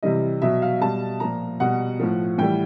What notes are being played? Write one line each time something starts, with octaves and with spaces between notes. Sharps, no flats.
C3 E3 G3 D#5
B2 F#3 E5
F5
B2 G3 A5
A#2 F3 A#5
B2 G3 F#5
A2 F3
A2 E3 G3 G5